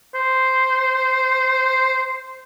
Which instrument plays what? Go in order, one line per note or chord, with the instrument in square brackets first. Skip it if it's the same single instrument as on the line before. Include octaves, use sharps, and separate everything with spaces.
[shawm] C5